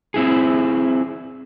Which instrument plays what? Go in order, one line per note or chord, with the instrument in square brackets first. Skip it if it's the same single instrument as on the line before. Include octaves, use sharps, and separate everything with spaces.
[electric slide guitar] C4 E4 G#4